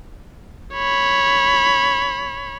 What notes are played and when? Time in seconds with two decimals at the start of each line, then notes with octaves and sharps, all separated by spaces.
0.75 C#5 B5